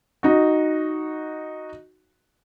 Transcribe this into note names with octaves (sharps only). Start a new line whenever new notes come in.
D#4 F#4